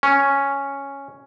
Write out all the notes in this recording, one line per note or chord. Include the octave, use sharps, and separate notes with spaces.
C#4